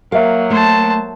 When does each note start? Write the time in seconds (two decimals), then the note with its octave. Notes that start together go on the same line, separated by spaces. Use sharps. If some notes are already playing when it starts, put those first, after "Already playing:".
0.12 F#3 A#3 A#4 E5 F5
0.50 A3 C5 A5